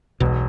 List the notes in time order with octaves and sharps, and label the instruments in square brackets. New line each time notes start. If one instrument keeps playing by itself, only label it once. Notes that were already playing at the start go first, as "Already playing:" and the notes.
[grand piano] E1 [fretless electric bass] B1 B2